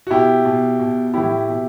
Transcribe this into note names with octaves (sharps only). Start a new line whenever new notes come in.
F#4
B2 E4 G4
B2
B2
A2 E3 E4 G4
B2